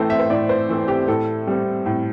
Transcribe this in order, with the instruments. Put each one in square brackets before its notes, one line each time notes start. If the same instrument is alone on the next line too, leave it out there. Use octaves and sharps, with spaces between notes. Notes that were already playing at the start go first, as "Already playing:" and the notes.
Already playing: [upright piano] A2 E3 A3 C4 A4 C5
E5
C5
A2 D5
C5
E3 A3 C4
G4
A2 A4
G3 C4
A2